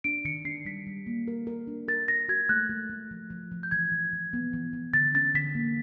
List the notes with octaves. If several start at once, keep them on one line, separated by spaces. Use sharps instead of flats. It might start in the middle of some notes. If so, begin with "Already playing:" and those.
D4 D7
D#3 C#7
D4 C7
G3 B6
G3
A#3
A#4
A#4
D4
A#4 A6
A#4 A#6
F#4 G#6
A3 F#6
A3
A3
F3
F3
F3
G6
E3 G#6
E3
E3
B3
E3
E3
D3 A6
C#4 A6
D3 B6
A#3